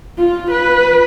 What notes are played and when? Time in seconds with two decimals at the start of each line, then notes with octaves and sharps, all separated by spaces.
0.17 F4
0.51 B4